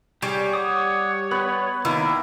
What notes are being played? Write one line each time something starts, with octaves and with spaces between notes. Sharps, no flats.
G3 G4 G#4 C#5
C#5 F#5 D6 D#6
B3 B4
D#3 A#3 E4